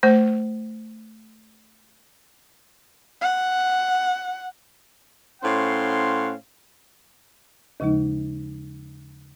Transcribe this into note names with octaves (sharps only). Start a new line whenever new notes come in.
A3 C5
F#5
A2 C#4 C5 F5 F#5 C6
D#2 C#3 F3 G#3 D#4